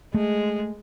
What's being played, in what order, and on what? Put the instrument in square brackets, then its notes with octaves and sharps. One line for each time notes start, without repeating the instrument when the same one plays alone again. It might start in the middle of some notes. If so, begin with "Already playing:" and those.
[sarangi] G#3 [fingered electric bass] A3